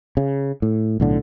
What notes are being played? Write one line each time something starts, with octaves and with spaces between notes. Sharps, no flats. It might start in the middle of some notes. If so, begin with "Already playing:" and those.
C#3
A2
B1 A2 D3